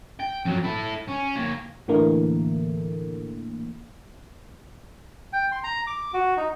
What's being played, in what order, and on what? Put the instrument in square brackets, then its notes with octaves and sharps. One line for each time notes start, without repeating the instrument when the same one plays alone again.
[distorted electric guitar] G5
F2 F#3
E4 A4
C#4
A#3 C#5
[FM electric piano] A2 D3 E3 A3 A#3
[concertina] G5
C6
A#5
D6
F#4
D#4